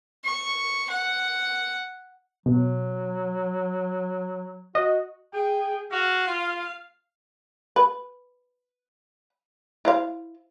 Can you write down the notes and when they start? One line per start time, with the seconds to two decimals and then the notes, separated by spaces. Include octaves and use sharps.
0.24 C#6
0.90 F#5
2.46 B2 F#3
4.75 F#4 D#5
5.33 G#4 G5
5.92 F#4 F5
6.27 F4
7.76 B4
9.85 E4 C5 F5